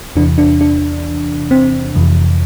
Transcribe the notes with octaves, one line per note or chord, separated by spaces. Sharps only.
E2 C3 E3 D4
D4
D4
C4
F2 C3 E3